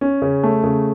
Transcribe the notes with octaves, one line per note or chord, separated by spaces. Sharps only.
C#4
C#3
A3
C#3